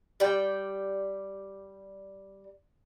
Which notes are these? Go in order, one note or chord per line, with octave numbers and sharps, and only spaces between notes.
G3 D5 G5